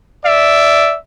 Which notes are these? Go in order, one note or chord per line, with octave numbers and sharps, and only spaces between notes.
D5 E5